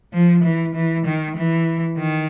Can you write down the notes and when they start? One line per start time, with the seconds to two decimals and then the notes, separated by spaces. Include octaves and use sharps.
0.13 F3
0.44 E3
0.75 E3
1.06 D#3
1.36 E3
1.98 D#3